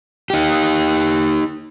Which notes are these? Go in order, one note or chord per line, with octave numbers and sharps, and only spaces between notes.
D#4 G4